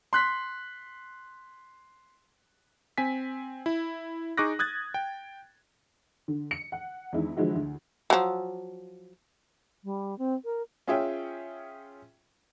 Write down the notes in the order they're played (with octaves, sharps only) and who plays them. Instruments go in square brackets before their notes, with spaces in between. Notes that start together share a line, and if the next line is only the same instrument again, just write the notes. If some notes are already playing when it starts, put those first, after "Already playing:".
[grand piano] C6 F#6 B6
[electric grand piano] C4 G#5 B6
E4
D#4 G#4 C#6 D6 F#6 A#6
D#6 F#6 G#6 A6
G5
[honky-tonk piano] D3
C#7
F#5
E2 D#3 G#3 D4 E4
D3 E3 F3 G#3 E4 F#4
D2
[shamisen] F3 F#3
[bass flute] G3
C4
A#4
[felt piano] C#4 F4 G#4 C#5 E5 G5